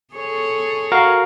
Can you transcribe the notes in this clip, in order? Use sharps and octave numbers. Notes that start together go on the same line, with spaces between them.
G#4 A4 C#5
F#4 A#4 F5